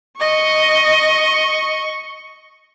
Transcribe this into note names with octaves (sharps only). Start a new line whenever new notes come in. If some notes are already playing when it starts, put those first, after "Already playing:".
D#5 C#6